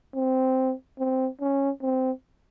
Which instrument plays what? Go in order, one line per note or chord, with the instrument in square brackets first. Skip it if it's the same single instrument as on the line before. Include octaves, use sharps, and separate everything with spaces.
[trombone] C4
C4
C#4
C4